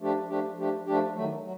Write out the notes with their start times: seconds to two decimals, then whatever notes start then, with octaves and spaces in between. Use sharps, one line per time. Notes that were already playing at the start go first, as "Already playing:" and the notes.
0.01 F3 A3 D4 G4
0.29 F3 A3 D4 G4
0.57 F3 A3 D4 G4
0.86 F3 A3 D4 G4
1.15 D#3 F#3 A3
1.43 F#3